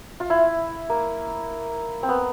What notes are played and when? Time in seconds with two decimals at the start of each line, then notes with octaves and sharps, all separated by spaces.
0.20 F4
0.30 E4
0.90 A#3
2.03 C4
2.09 B3